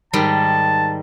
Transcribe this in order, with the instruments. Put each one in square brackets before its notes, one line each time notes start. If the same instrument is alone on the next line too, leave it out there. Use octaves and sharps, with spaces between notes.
[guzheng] G#2 D#3 G3 [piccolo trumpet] A5